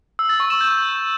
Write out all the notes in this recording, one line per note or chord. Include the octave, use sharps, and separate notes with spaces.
E6
A6
C#6
E7
G6